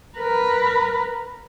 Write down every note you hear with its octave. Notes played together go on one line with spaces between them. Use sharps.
A#4 B4